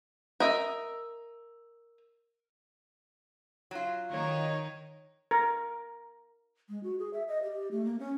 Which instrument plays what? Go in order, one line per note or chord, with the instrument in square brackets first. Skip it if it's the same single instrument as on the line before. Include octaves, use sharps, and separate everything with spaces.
[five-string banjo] A#4 D#5 E5
[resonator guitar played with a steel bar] F#3 F4
[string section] D#3 D#4 [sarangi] C#5
[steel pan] A#4
[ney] G#3
F#4
G#4
E5
D#5
G4
A3
A#3
C#4